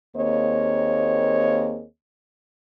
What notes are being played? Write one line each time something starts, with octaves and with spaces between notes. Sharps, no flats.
D#2 A#3 C4 G#4 C#5 D#5